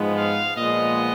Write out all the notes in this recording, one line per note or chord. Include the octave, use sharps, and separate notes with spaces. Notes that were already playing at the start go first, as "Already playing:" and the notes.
Already playing: G#2 F3 G#3 B3
F5
A#2 F3 G#3 B3 D#5